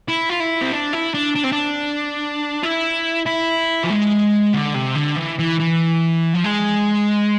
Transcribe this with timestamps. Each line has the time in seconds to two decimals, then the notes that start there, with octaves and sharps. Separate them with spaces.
0.08 E4
0.30 F4
0.40 E4
0.61 C4
0.72 D4
0.93 E4
1.14 D4
1.36 D4
1.44 C4
1.53 D4
2.63 E4
3.26 E4
3.84 F3
3.90 G#3
4.54 D3
4.75 C3
4.96 D3
5.17 E3
5.39 E3
5.60 E3
6.34 F3
6.44 G#3